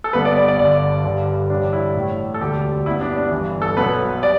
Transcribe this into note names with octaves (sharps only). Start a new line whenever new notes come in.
A4
G1 G2 D3 B3 B4
D5
D5
D5
G1 G2 D3 D5
G1 G2 D3 G3
A1 G2 D3 G3 D4
E4
A1 A2 A3
A4
E1 D2 D3 G3 G4
G2 G3 B3 E4
D4
D4
G1 G2 E3
A4
B1 B2 B3 B4
G3 D5